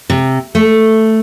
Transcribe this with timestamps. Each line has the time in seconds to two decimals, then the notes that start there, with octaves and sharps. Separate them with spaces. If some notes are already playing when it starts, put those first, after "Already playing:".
0.10 C3
0.55 A3